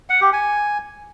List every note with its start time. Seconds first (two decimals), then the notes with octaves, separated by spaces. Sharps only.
0.10 F#5
0.21 G4
0.33 G#5